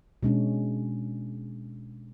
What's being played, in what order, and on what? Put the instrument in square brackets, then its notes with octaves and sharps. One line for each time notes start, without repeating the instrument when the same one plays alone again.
[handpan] B2 G#3 C#4 D4